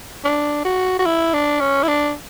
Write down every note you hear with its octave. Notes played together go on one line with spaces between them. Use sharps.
D4
F#4
F#4
E4
D4
C#4
E4
D4